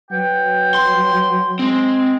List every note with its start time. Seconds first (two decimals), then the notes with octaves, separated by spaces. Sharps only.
0.11 F#3 B4 F#5 G5
0.74 C6
1.59 G#3 C4